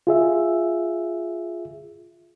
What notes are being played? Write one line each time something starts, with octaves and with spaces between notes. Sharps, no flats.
F4 G#4 E5